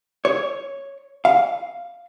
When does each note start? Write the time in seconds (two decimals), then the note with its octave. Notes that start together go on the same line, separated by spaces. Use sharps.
0.25 C#5
1.25 F5